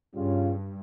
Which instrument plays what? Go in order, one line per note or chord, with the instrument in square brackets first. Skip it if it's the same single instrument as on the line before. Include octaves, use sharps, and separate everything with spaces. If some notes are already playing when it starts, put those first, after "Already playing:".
[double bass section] G2 [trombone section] C#3 G3 C#4 F4